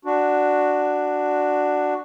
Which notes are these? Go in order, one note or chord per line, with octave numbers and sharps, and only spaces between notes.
D4 F#4